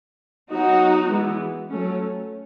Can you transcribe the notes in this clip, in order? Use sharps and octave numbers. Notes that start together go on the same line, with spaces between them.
F#3 B3 D#4 F#4
E3 G#3 B3
F#3 A3 C#4